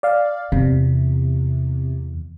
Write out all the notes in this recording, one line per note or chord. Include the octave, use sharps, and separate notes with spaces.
D5 F5
E2 C3